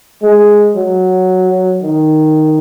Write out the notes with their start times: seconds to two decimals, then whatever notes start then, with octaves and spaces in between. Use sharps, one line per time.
0.23 G#3
0.76 F#3
1.83 D#3